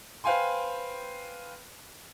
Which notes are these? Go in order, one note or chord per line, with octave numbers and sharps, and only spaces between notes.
B4 C5 F5 G5 G#5 C6